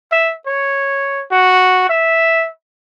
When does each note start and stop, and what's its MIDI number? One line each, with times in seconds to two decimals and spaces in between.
0.12 0.33 76
0.47 1.23 73
1.31 1.89 66
1.90 2.49 76